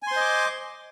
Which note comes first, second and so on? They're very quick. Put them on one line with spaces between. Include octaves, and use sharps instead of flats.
G#5 C6 C5 D#5 D6